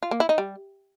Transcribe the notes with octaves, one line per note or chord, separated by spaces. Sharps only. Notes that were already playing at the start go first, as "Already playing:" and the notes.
F4
A#3
E4
D#4
G3